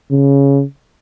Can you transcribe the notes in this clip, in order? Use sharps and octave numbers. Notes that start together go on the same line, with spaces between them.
C#3